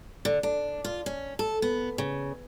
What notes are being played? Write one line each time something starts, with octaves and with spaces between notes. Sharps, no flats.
D3
D4
F4
C#4
A4
B3
C#3